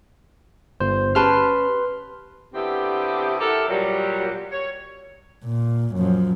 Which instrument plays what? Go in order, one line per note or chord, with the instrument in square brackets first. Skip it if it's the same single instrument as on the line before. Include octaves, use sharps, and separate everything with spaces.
[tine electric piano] G1 C5
[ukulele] C#4 G4 A5 [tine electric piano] B4 C6 F6
[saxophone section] D3 B3 C4 E4 G4
E4 G4 A4 A#4 E5 F#5
A#2 F#3 G3
C#5
[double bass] A#2
F#2 F3